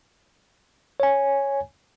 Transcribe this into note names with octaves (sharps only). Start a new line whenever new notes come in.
C#5 G#5